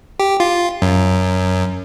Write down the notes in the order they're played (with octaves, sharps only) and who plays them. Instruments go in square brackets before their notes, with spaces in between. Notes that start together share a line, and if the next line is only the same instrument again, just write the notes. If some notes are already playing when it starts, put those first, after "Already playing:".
[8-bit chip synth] G4
F4
F#2